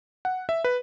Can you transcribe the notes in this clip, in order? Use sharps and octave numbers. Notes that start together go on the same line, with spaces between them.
F#5
E5
B4